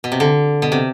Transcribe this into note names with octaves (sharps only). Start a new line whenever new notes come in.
B2
C3
D3
B2
C3